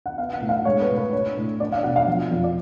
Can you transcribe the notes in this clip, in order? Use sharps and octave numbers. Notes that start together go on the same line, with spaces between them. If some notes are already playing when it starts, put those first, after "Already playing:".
F#5
B3 F5
F#5
A2
F5
G#3 C#5
B4
A2
B4
D4 C#5
A2
D4 D5
F5
B2 F#5
F5
F3
F2
D5